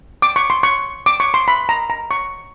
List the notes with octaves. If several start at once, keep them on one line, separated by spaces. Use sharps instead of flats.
D6
C#6
C6
C#6
D6
C#6
C6
B5
A#5
A#5
C#6